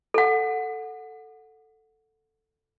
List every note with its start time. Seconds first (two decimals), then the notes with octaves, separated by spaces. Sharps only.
0.14 A4 F#5